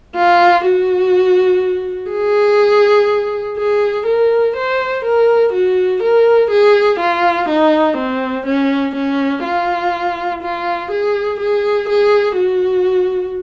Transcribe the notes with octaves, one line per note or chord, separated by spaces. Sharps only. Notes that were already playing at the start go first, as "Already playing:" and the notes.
F4
F#4
G#4
G#4
A#4
C5
A#4
F#4
A#4
G#4
F4
D#4
C4
C#4
C#4
F4
F4
G#4
G#4
G#4
F#4